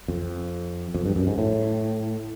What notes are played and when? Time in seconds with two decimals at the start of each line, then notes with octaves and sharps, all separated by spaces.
0.08 F2
0.94 F2
1.06 G2
1.16 F#2
1.27 G#2
1.38 A2